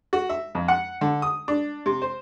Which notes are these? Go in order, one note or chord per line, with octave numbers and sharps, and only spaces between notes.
F#4
E5
F2
F#5
D3
D#6
D4
C3
C5